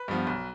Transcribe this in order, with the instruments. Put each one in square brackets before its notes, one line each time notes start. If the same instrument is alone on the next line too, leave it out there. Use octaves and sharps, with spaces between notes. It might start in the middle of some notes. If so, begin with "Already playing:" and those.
Already playing: [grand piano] B4
G2 F3 B3
B1